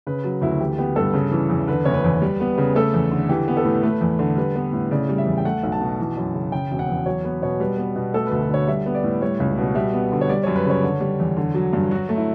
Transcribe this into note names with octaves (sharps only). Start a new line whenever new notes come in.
C#3 B4
F#3
D2 E4
F#4
E3 G4
B3 G4
G2 A4
C#3
E3
E2
D3 B4
F#1 C#5
B4
E2
G3
B3
C#3
A3 A4
E2
D3
E3 G4
B3
A4
A2
A3 B4
E2
D3
G3 B4
B3
A2
C#3 D5
G3
E5
E2
G5
A3 F#5
B1
A5
B2
E3
F#2
C#3
C#3 G5
E1
F#5
E2
F#3 C#5
B3 B4
B2 C#5
G3 B4
B3
B2
A3 A4
D2 B4
B4
D3 C#5
G3 E5
B3
D5
A2
G3 C#5
C#2
B2
G3 E5
B3
D3
C#5
G3 D5
F#2 C#5
B4
C#3 C#5
D3
G3
E2
D3
F#3
G2
F#3 F#4
A3
E4